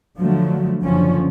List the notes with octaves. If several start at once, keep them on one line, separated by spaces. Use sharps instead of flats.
D3 F3 F#3 A3
F#1 D3 F3 C#4